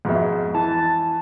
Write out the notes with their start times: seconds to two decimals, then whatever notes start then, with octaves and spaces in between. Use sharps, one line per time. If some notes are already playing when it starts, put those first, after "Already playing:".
0.05 F2 G#2 B2 E5
0.54 E3 A5